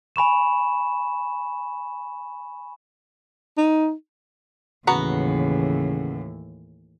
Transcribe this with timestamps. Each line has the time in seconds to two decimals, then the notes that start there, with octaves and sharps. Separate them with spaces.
0.16 G#5 B5 C#6 E7
3.58 D#4
4.87 D#2 A2 C#3 E3 B3 F#4 A#5